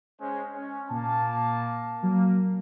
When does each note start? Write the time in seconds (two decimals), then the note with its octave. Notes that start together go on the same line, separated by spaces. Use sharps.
0.20 G#3 C#4 C5
0.54 C#4
0.90 A#2 A#3 A5
2.03 F#3 A#3